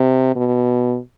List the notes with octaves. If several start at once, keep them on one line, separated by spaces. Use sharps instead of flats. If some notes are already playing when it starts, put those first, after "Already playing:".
Already playing: C3
B2